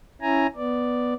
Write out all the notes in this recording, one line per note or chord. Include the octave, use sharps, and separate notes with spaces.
C#4 E4 G#5 A#5
B3 D5